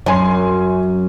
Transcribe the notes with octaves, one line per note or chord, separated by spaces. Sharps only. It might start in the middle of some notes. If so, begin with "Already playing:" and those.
F#2 C#5 G#5 C6